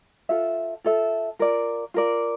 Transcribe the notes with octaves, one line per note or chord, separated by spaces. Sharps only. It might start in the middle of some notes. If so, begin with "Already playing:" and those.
F4 A4 E5
F4 A4 E5
F4 A#4 D5
F4 A#4 D5